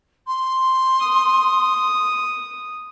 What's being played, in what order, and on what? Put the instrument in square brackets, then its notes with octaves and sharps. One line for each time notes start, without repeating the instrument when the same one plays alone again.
[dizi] C6
[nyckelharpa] D#6